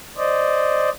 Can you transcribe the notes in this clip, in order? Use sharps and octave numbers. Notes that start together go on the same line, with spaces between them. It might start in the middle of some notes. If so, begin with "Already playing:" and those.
C5 D5 D#5